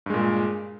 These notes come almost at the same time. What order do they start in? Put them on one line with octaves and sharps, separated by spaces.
G2 G#3 A#2